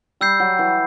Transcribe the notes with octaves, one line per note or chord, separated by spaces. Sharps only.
G3 E6 G6 C7
F#3
E3